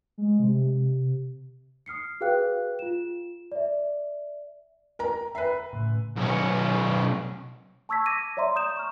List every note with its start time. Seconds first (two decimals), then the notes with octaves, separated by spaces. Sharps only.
0.18 G#3
0.39 C3
1.86 D#6 F6 C7 C#7
2.21 F#4 G#4 B4 F5 G5 F#6
2.79 F4 E7
3.52 D5 E5
4.99 A#4 A#5
5.35 B4 E5 A#5 C7
5.73 A2 C#3
6.16 B1 C#4
7.89 A5 C#6 E6 G#6 B6
8.06 D6 G#6 A#6 D#7
8.37 C#5 D5 E5 A#5 C6
8.55 A#5 D#6 G6 E7
8.77 C#6 F6